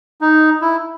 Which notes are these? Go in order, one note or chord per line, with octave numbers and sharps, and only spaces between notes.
D#4
E4